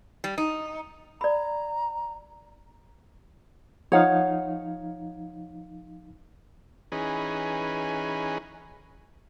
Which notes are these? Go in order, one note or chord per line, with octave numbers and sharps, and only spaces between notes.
G3
D#4
D5 A#5 B5
F3 D#4 C#5 F5 F#5
E3 C#4 D#4 G#4 B4